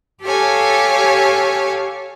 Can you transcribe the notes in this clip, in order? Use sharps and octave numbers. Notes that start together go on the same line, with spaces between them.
G4 A4 C#5 F5 G#5